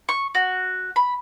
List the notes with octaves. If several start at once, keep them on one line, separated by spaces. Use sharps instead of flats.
C#6
F#4
B5